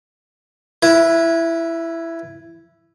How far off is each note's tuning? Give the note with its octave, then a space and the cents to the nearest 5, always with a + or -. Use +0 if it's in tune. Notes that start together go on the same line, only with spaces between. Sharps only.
E4 +10 B4 -25